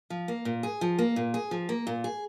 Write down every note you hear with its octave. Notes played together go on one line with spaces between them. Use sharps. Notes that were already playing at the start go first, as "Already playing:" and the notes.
F3
A#3
A#2
G#4
F3
A#3
A#2
G#4
F3
A#3
A#2
G#4